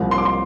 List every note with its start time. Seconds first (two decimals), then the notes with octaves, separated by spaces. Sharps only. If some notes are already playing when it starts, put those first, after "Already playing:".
Already playing: C2 A#2 F3
0.11 C6
0.18 D6
0.25 C6